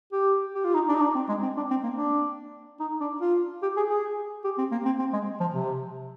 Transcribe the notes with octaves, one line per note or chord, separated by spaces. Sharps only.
G4
G4
F4
D#4
D4
D#4
D4
C4
G#3
C4
D4
C4
A#3
D4
D#4
D4
F4
G4
G#4
G#4
G4
C4
A#3
C4
C4
G#3
F3
C3